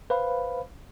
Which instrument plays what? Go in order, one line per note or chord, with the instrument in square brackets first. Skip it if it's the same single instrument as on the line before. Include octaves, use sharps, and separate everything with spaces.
[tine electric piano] B4 C5 F5 B5